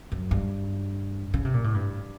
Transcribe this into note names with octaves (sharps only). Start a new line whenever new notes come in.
F#2
G2
C#3
C3
A#2
A2
G2